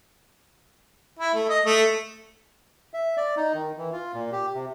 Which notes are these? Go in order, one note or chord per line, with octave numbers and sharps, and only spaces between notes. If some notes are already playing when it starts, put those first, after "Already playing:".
E4
A3
D#5
A3
E5
D5
D#4
D#3
E3
F4
A#2
G4
C3